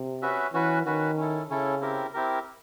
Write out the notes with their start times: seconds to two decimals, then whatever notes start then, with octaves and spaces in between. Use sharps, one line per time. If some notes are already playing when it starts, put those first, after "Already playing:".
Already playing: C3
0.22 C#4 F#4 B4 E5
0.53 E3 C#4 F#4 B4
0.86 D#3 C#4 F#4 B4
1.17 C#4 E4 A4
1.49 C#3 C#4 E4 A4
1.81 C4 E4 G4 A#4
2.14 C4 E4 G4 A#4